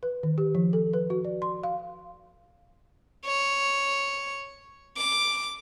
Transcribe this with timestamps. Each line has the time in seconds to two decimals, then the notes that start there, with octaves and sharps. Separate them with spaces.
0.03 B4
0.23 D#3
0.38 G4
0.55 F3
0.73 A4
0.93 B4
1.10 F#4
1.25 D5
1.42 C6
1.63 F5
3.25 C#5
4.97 D6